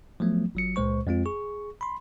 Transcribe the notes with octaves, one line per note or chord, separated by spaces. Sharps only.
F3 F#3 A3 B3
G1 F#3 C#7
C#2 A#2 G#3 C5 C#6
F2 G#3 C4 F4
G#4 C#6
B5 C6